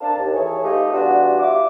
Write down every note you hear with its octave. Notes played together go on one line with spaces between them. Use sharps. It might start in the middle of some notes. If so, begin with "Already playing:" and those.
C4 D4 A#4 F5 A5
D#2
E3 A3 G#4 A4 C#5
A3 D#4 F4 G4 B4 D#5
E3 G3 B3 D4 F4 F#4
G3 E4 F4 E5 D6